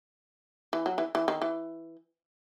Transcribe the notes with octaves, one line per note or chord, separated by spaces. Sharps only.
E3
F#3
E3
E3
D#3
E3